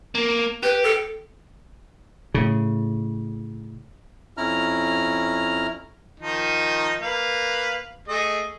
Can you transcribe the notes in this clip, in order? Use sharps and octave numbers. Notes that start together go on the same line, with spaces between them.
A#3
G4 B4
A4
A2 C#3
F2 C#4 E4 A#5 F6
D#3 F3 D#4
A#3 B4 F5
A3 G#4 D#5